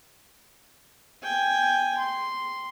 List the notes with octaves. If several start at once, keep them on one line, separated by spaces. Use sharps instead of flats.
G5 G#5
C6